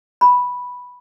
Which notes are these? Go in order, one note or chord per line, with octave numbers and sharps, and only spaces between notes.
B5